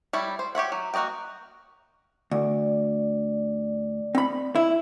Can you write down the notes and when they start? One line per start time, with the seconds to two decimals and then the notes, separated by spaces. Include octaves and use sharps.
0.13 G3 E4 C#5
0.39 C5
0.55 G4 C#5 E5 F#5
0.72 F#3
0.94 A#3 F#4 D5 D#5 G5
2.31 D2 D5
4.15 C4 B5
4.56 E4